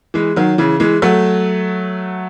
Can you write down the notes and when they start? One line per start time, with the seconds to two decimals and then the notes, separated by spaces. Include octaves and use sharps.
0.14 E3 G#3
0.36 D#3 F#3
0.58 C#3 E3
0.80 E3 G#3
1.02 F#3 A3